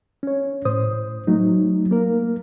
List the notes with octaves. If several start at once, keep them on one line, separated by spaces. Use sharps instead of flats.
C#4 C#5
A2 C5 D#6
F#3 A3 D#4
A#3 A#4